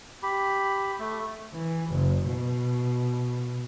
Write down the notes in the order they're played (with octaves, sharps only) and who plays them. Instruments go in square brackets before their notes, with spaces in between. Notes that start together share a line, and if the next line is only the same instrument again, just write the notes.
[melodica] G4 B5
A3
[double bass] E3
F#1
B2